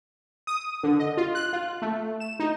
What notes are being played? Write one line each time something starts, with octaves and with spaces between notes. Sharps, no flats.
D#6
D3
D#5
F4
F#6
F4
A3
E7
D#4